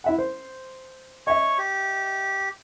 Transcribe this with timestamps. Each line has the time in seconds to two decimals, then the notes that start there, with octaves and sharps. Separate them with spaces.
0.04 E4 E5 F#5
0.18 C5
1.27 C#5 D#5 E5 C#6
1.58 G4